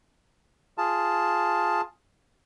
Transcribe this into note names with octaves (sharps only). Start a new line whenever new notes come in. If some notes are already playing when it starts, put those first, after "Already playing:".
F4 G#4 A5